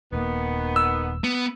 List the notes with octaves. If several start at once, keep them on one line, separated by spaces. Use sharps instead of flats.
D#1 D#3 A#3 B3
E6
B3